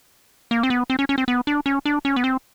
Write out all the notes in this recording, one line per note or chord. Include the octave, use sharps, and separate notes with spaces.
A#3
C4
B3
C4
C#4
C#4
C4
B3
D4
C#4
D4
C#4
B3
C4